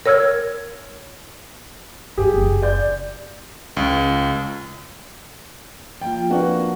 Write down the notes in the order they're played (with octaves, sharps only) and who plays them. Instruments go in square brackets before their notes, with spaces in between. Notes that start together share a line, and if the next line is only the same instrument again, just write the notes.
[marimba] A#4 C#5 E6 F6 G#6
[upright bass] G2 [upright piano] G4 G#4
[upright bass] F#1 D#2
[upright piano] D5 G6
[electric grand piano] C#2
[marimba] F3 A#3 F4 [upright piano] G5
[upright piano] A#3 D4 F#4 [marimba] B4